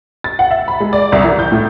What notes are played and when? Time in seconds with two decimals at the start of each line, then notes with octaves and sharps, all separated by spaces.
0.24 A6
0.39 F#5
0.51 E5
0.68 B5
0.80 G#3
0.93 D5
1.12 C2
1.24 E3
1.39 G6
1.52 A2